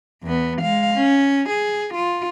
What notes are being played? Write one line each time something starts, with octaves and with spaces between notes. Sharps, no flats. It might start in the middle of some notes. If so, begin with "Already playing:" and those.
E2 B3
G#3 F5
C#4
G#4
F4